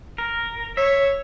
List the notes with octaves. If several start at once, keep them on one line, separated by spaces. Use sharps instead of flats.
A#4
C#5 E5